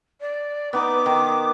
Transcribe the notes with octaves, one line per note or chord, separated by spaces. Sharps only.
D5
B3 D#4 D6
D#3